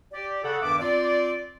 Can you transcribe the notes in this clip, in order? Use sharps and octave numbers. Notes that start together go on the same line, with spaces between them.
G4 D5
C#3 A4 F#5
E2 G2 D#3 E5 D6
C4 F4 D5